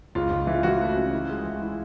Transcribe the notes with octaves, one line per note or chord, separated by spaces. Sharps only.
C#2 F4
C#2
E3
F4
E3 F#4
A3
C#3
E4
G#3
E3
E4